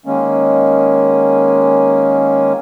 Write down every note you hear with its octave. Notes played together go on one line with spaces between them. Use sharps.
D#3 G#3 A#3 C#4